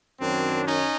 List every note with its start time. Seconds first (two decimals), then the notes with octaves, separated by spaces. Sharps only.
0.21 F#2 D#3 F#3 C4 D4
0.67 C#4 D#4